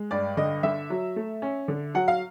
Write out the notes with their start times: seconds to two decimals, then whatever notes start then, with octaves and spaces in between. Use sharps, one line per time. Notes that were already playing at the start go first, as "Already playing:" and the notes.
Already playing: G#3
0.11 G2 D5
0.37 D3 D#5
0.63 D3 E5
0.90 F#3
1.16 A3
1.42 C#4
1.68 D3
1.95 F#3 F#5
2.08 F5